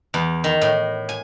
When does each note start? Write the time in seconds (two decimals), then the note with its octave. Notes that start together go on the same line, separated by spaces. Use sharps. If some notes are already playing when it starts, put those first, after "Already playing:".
0.14 E2
0.44 D#3
0.61 A2
1.09 G#5